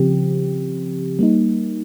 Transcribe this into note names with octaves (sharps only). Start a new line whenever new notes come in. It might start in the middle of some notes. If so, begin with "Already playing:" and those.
Already playing: C#3 F3 C4 G4
G3 A#3 D#4